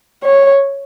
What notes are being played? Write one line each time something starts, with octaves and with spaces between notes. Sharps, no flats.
C#5